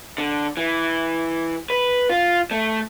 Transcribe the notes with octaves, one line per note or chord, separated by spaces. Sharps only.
D3
E3
B4
F4
A3